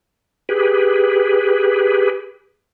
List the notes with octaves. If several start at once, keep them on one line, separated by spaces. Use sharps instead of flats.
G4 G#4 B4